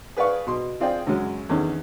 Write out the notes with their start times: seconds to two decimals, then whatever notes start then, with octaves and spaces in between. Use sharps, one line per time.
0.17 G#4 B4 D5 F5 C#6
0.46 B2 C6
0.80 C4 F4 G#4 D5 G5
1.07 F#2 C#3 F#3 G#3 C#4
1.49 E2 D3 D#3 C#4